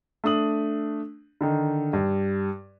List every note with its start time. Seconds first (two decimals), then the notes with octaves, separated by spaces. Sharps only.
0.24 A3 D4 D#6 F#7
1.41 D3 D#3 D#4
1.93 G2